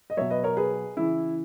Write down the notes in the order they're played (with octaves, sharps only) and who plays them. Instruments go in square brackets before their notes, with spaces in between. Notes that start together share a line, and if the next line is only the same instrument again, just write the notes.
[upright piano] D#5
B2 F#3 C#5 E5
B4 D#5
A#4 C#5
G#4 B4
C#3 E3 E4